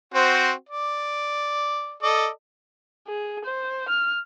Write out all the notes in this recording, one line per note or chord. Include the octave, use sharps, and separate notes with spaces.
C4 F#4 C5
D5
A4 D5 D#5
G#4
C5
F6